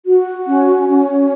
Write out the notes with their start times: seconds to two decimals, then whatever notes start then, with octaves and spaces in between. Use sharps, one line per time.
0.06 F#4
0.46 C#4
0.88 C#4